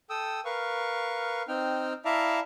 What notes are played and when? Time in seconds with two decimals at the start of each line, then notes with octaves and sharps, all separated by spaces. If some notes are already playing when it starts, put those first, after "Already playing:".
0.10 A4 G5 D#6 E6
0.45 A#4 B4 F5 C#6
1.48 C4 D#4 G5 F6
2.05 E4 D5 E5 F5 A5 A#5